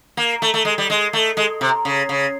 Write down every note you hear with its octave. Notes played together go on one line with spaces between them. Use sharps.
A#3
A3
A3
G#3
G3
G#3
A3
G#3
C3
C#3
C#3